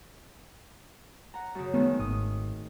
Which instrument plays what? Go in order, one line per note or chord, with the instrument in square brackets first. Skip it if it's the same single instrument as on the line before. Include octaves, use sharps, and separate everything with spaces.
[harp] F#5 A#5
F#2 C#3
[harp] D#3 G#3 A3 [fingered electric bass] B3
[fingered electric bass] G#1 [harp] D#6